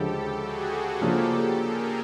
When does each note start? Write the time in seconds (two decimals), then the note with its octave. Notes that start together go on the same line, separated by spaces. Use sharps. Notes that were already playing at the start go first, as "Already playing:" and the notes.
Already playing: D2 C#3 F3 G#3 G4 A4
0.40 F#4 G#4
1.01 C#3 F3 A#3 D4 F4 G4 A4
1.62 G#4 A#4